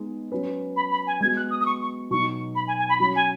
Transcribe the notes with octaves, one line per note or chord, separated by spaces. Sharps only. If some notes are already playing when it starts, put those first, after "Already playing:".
Already playing: G#3 B3 D#4
F#3 C#4 B4
B5
B5
G#5
G#3 B3 F#4 G#6
F#6
D#6
D#6
C#6
C#6
B2 F#3 B3 D#4 C#6
B5
G#5
G#5
B5
F#3 C#4 F#4 B5
G#5